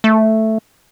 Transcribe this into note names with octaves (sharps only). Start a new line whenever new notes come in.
A3